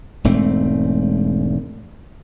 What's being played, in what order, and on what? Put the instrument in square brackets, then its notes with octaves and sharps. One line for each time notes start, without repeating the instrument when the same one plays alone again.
[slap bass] E1 G#2 A3 C4